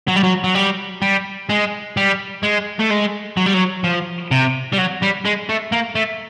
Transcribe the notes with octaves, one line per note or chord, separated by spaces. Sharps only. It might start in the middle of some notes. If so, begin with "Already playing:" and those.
F#3
G3
F#3
F#3
G3
G3
G#3
G3
G#3
A3
G#3
F#3
G3
F#3
F3
C3
G3
F#3
G3
G#3
A3
A#3
A3